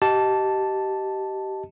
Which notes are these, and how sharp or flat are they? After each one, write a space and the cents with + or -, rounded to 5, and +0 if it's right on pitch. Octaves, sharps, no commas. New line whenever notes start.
G4 -25 D#5 +0 A5 +0